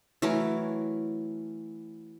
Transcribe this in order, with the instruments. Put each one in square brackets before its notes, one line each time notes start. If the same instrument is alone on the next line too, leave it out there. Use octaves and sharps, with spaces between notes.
[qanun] E3 F#3 A3 A#4